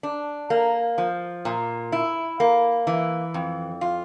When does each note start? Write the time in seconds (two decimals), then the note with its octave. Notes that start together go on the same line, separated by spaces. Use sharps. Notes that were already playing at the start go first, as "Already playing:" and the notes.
0.03 D4
0.50 A#3
0.98 F3
1.45 A#2
1.92 E4
2.40 A#3
2.87 E3
3.34 F2
3.81 F4